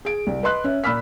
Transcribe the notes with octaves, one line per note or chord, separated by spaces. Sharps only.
G#4 D7
C2
B4 D#5 C6 F#6
C#4 E5
A#2 A#3 B5 E6 F6 B6